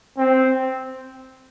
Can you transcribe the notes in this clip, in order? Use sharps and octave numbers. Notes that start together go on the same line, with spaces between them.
C4